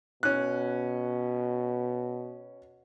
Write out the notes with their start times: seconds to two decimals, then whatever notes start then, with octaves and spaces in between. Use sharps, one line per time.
0.23 B2 C#4 F#6